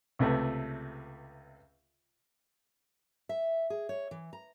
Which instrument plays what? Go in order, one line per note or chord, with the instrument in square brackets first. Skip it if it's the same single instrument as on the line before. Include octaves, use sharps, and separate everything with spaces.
[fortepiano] C#2 C3 A3 B4
[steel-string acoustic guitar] E5
G#4
C#5
E3
A#5